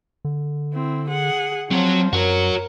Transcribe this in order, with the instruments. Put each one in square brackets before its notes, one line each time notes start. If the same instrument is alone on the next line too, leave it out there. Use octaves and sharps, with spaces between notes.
[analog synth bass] D3
[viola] C4 E4
G#4 F#5
[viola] F3 [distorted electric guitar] F#3 C#5 [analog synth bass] C4
[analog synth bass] F#2 [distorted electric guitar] F#4 C#5 [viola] A#4